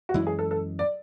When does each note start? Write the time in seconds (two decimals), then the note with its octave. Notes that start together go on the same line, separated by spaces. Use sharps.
0.09 F#4
0.14 F#2 E3 G#3 E4
0.27 G#4
0.39 A4
0.51 A4
0.79 D5